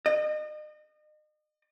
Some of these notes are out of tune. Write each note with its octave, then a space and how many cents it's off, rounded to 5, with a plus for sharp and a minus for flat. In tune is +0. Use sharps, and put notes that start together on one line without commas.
D#5 -35